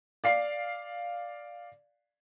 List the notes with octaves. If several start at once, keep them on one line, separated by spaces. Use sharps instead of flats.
D5 F5 C7